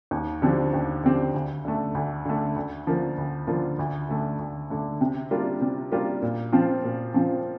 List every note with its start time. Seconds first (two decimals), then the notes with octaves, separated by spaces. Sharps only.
0.11 D#2
0.42 D3 F3 C4 G4
0.73 D#2
1.03 D3 F3 C4 G4
1.35 D2
1.65 D3 A3
1.95 D2
2.25 D3 A3
2.56 D2
2.87 D3 F3 A#3 F4
3.18 D2
3.47 D3 F3 A#3 F4
3.79 D2
4.09 D3 A3
4.39 D2
4.70 D3 A3
5.01 C3
5.31 G3 A#3 D4 F4
5.61 C3
5.92 G3 A#3 D4 F4
6.22 A#2
6.53 F3 C4 F4
6.84 A#2
7.14 F3 C4 F4